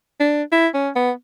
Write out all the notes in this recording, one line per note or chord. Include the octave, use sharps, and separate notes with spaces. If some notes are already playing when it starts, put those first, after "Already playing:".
D4
E4
C#4
B3